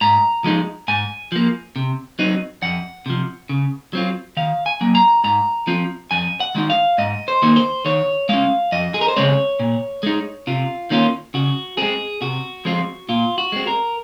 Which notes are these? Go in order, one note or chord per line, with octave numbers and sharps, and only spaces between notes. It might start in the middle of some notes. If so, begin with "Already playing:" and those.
G#2 A#5
F3 G#3 D#4
G#2 G#5
F3 A#3
C3
F#3 C4 D#4
F2 F#5
C3 F3
C#3
F#3 C4 F4
D#3 F5
G#5
F#3 A#3
A#5
G#2 A#5
F3 C4 F4
F2 G#5
F#5
D#3 G#3 D#4
F5
G#2 D#5
C5
D#3 A#3 D#4
C5
D#3 C#5
G#3 C#4 F5
F2 D#5
G#4
A#4
C5
C#3 G#3 C4 C#5
A#2
G#3 D#4
C3 F4
D#3 A#3 C#4 F4
C#3 F#4
G#3 C4 G#4
C3 F#4
F3 G#3 C4 F4
A#2 F4
F#4
G#3 C4
A#4